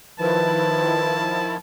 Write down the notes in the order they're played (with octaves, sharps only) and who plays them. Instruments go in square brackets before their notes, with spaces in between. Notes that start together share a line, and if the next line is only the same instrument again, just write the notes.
[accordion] D#3 F3 E4 [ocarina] B4 [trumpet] A5